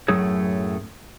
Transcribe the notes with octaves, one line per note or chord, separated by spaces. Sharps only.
F#2 A2 F#3 A3 G#4 C#5